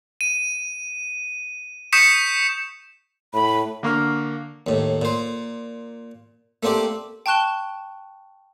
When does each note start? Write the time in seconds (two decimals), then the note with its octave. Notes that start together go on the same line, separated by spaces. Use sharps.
0.21 D#7
1.93 C#6 D#6 G6 B6 C#7 E7
3.34 A2 B5
3.83 D3 A#3 C#6 F6
4.67 D#2 A2
5.02 A#2 C5
6.63 A3 A#3 C4 D4 G4
7.26 G5 A5 C#6 F#6 E7 G7